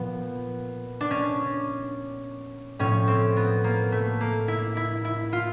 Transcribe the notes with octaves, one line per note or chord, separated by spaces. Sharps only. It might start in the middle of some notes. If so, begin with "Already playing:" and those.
Already playing: A#2 F3 B3
D4
C#4
A2 F3 C#4
C4
B3
A#3
A3
A#3
E4
E4
E4
F4